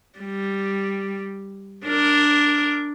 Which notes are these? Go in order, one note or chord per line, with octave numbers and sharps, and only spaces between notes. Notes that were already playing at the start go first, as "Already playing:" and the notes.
G3
D4 A#4